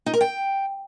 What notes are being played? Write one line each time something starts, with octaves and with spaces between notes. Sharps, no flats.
D#4
A#4
G5